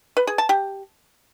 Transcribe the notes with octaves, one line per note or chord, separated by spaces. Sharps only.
B4
G#4
A5
G4